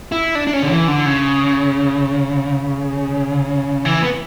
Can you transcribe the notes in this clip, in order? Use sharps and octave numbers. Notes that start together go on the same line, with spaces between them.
E4
D4
D4
C#4
D3
E3
D3
C#3
E3
B3